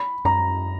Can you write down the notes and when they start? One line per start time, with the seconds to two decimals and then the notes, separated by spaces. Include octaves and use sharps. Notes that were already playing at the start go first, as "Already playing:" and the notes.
Already playing: B5
0.25 F#2 A#5